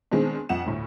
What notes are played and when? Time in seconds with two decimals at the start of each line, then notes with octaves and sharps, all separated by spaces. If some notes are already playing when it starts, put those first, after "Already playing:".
0.11 D#3 G#3 B3 C4 D4
0.49 F2 F#5 E7
0.66 D2 A2